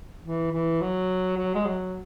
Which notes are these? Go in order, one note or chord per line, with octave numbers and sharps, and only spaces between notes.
E3
E3
F#3
F#3
G#3
F#3